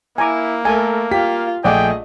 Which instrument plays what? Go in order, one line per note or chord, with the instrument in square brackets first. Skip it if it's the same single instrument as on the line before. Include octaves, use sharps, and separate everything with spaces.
[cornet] A#3 [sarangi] E4 [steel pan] G#5 A#5 D6
[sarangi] A3 [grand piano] A4 A#4 [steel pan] G#5
[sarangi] F4 [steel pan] G4 [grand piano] B6
[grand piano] A#1 A3 G#4 [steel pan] D5 F#5 D6 [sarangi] D#5 [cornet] G5